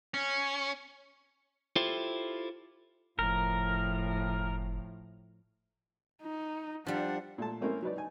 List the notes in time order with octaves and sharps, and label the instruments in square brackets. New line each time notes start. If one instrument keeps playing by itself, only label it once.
[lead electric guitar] C#4
[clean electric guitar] E4 F4 G4 A4 C5
[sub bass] F#1 [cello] A2 F3 [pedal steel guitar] A#4
[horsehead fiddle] D#4
[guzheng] F3 G3 [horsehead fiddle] D4 F#5
[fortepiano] A#2 A3 A5
A3 A#3 C4 C#4 E4 A#4
F#3 D#4 B4 D5
D#4 G#5